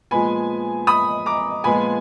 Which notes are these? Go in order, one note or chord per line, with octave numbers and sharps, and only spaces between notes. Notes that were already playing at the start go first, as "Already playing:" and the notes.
A#2 F3 G#3 B3 G#5 B5
B5 D#6
A#5 D6
A#2 F3 G#3 B3 F4 G#5 B5